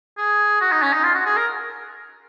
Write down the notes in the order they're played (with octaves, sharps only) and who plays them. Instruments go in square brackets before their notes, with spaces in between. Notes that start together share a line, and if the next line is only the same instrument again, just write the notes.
[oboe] G#4
F#4
D#4
C#4
D#4
F4
F#4
G#4
A#4